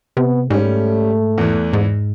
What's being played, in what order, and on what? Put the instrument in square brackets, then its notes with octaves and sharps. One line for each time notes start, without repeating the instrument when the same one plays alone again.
[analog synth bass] C3 [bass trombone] B3
[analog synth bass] G#2 [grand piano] G3 C#4 [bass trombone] A3
[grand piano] E2 E3
[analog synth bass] G#2